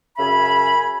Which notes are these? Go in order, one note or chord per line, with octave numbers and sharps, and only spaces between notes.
F#2 C#3 E5 G#5 B5